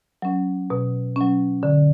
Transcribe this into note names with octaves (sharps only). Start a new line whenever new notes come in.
F#3 C#4
B2
F#3 C#4
D3